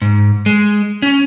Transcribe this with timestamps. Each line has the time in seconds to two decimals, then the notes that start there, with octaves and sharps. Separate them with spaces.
0.02 G#2
0.46 G#3
1.02 C#4